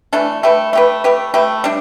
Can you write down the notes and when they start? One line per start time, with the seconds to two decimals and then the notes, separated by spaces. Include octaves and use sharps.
0.13 E3 A3 D4 A4
0.43 A3 G4 B4
0.73 A3 G4 B4
1.04 A3 G4 B4
1.34 A3 G4 B4
1.64 G3 D4